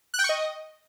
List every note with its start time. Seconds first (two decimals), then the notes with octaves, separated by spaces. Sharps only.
0.14 F#6
0.19 G5
0.24 C#6
0.29 D#5